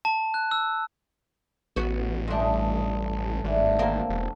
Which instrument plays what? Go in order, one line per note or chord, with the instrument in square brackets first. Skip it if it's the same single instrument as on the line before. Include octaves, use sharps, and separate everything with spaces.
[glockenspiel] A5
F#6
E6
[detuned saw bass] A1 [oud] B3 F#4
[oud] G2 D4 [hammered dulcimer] G#3 A3 D#5
[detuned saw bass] G#1 [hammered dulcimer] A2 D3 E3
[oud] A#3 C4
[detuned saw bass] E1